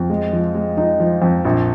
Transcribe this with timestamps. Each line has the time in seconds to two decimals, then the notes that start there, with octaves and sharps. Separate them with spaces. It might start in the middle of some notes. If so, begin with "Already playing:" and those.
Already playing: F2
0.10 G#3
0.33 F3
0.55 G#3
0.77 F3 D#4
1.00 F3
1.22 F2
1.45 A#1